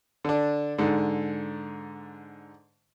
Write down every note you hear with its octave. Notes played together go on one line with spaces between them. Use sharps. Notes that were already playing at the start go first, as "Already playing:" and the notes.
D3 D4
G#2 D3